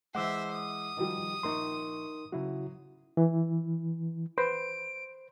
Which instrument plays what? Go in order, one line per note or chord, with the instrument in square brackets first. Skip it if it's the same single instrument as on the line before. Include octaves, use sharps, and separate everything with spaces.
[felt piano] E3 G#3 [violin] C5 E5 [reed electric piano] F#5 D6 E6
[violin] D#6
[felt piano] D#3 F3 G3
[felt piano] A#1 C#6 [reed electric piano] D#4 A#4 C6
[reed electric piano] C#3 E4 F#4 [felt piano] F#3
[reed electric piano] E3
[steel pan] B4 [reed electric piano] C5 [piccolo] D7